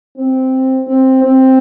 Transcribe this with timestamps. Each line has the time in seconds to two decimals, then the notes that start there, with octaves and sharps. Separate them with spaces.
0.17 C4
0.88 C4
1.23 C4